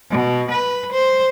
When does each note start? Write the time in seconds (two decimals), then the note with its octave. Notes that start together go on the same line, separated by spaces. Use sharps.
0.10 B2
0.51 B4
0.92 C5